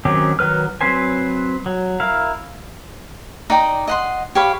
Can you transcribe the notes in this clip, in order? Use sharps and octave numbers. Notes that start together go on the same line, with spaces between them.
D#3 F#3 C4 C#4 G4
D#3 F#3 B4 F6
F#3 C4 B4 C5 G#5
F#3
E4 A#4 F5
D#4 D5 G5 A#5
D#5 F#5 C6
G4 C#5 F5 B5